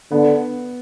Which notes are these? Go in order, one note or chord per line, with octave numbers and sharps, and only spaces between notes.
D3 B3